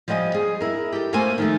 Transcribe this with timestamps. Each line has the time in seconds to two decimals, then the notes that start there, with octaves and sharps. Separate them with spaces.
0.08 F3 G3 D#5 F#5 G#5
0.34 G#4
0.61 E4 A#4
0.92 G4 A4
1.13 A3 A#3 C#4 A4 C5 G#5
1.38 D#3 F3 A3